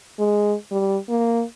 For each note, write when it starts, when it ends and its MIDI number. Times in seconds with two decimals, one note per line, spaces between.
0.19 0.54 56
0.72 0.97 55
1.09 1.43 58